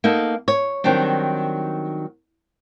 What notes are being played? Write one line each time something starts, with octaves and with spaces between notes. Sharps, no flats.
A#3 B3 D#4 A4
C#5
D#3 F#3 G3 C4 D4